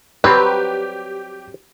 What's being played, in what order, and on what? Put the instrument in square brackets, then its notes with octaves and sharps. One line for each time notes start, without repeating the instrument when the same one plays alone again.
[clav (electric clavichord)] F#3 G3 C4 [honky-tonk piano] G4 [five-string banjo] B4